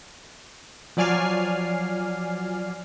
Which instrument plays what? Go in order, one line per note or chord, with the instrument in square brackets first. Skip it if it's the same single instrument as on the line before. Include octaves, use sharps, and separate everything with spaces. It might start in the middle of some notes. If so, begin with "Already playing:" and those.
[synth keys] F3 F#3 D5 G#5 F6 C7